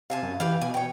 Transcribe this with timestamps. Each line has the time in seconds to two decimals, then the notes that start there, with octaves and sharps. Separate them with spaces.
0.10 C3 F5 G#5 A5
0.22 F#2
0.40 E3 G4 B4 F5
0.61 B2 G#5
0.74 C#5 G5